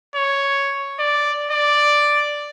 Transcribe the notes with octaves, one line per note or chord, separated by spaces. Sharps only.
C#5
D5
D5